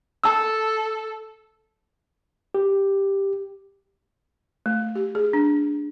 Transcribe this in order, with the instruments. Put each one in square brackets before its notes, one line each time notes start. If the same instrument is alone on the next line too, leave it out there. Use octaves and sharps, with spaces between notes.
[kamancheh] A4 [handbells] A5 E6
[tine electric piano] G4
[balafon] A3
G4
G#4
D4